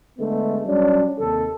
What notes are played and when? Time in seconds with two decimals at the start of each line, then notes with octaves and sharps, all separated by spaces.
0.18 D3 G#3 A3 B3
0.65 F#3 G3 C#4 D4
1.19 D#2 C3 D#3 A4